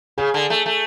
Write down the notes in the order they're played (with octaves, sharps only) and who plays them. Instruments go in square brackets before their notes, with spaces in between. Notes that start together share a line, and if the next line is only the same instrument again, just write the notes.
[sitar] C#3 [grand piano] G#4
[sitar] D3
A3
A3